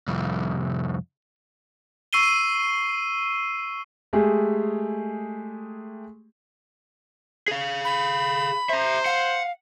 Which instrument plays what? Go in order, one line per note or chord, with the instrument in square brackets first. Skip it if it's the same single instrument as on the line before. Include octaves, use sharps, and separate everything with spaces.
[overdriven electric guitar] C2 F2
[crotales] C#6 E6 C7 D#7 G7
[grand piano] G#3 A3 G4 G#4
[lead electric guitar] G#4 F5
[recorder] B5
[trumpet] C5 [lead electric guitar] E5 A#5
[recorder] F5 [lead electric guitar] F#5